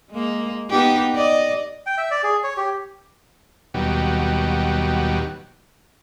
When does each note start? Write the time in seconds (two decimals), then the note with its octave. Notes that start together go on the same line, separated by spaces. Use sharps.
0.11 G#3 A#3
0.70 B3 D#4 G4
1.15 D5 D#5
1.86 G5
1.98 E5
2.11 D5
2.23 G#4
2.44 C#5
2.57 G4
3.74 D#2 B2 F#3 G3